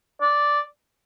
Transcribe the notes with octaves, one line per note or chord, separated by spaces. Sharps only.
D5